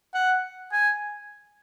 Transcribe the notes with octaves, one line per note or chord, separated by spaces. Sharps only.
F#5
G#5